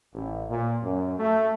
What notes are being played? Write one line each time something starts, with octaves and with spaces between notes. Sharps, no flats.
A1
A#2
F#2
A3